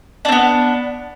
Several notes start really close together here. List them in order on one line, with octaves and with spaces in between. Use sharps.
D4 C4 B3